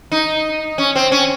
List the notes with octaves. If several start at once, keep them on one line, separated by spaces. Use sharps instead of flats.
D#4
C#4
C4
C#4